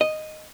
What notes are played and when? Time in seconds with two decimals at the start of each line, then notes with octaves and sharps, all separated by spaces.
0.01 D#5